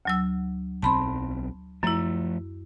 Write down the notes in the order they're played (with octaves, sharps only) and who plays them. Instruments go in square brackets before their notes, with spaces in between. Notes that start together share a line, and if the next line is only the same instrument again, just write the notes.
[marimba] D2 F#3 E6
[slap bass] B1 C4 [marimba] A5 B5 C6
[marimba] F#2 E4 [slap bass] F3 A3